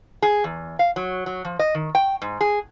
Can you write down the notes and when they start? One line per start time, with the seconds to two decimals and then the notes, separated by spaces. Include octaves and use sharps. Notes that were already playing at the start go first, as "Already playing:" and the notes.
0.22 G#4
0.44 E2
0.79 F5
0.96 F#3
1.26 F#3
1.45 F3
1.59 D#5
1.75 D#3
1.95 G5
2.22 G#2
2.41 G#4